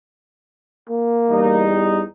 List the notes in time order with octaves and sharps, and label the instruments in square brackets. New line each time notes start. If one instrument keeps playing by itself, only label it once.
[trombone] A#3
[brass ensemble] E2 G3 D#4